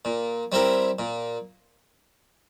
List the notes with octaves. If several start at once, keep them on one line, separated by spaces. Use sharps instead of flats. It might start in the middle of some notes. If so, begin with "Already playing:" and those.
A#2
G3 C4 E4 A#4
A#2